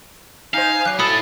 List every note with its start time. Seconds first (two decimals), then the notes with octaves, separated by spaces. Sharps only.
0.54 D#4 C5 F5 G#5
0.85 F#3 F#6 C7
1.00 E4 A4 B5 D#6 A6 C#7